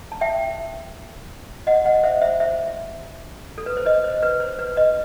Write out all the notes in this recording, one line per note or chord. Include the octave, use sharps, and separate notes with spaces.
A5
E5 G5
D#5 F#5
D#5 F#5
C5 E5
C5 E5
C5 E5
A4
B4
C5
B4 D#5
C5
B4
C5
B4
B4 D#5